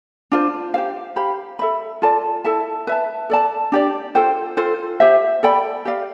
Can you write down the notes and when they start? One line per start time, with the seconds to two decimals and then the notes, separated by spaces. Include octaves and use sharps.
0.32 D4 F4 C5
0.74 G4 C5 F5
1.16 G4 C5 F5 B5
1.59 A4 E5 B5
2.02 F4 A4 D5 A5
2.44 E4 A4 E5 A5
2.87 B4 E5 A5
3.30 A4 D5 A5
3.72 D4 G4 D5
4.15 F4 A4 C5 G5
4.57 F4 A4 C5
5.00 G4 C5 E5
5.43 A4 D5 G5 B5
5.85 G4 D5 F5